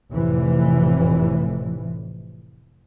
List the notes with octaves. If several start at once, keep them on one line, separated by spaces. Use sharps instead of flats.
F1 F2 A2 C3 E3